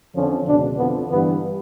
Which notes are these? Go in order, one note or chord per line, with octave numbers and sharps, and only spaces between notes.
F2 D3 F3 C#4
C#2 B2 D4
F2 D3 F3 B3
G2 E3 B3